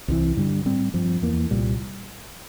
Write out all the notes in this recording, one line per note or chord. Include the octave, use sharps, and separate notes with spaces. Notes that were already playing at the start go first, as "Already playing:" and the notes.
C2 C3 E3
G2 D3 G3
A2 G3 C4
G2 F3 C4
E2 E3 A#3
C2 A#2 G3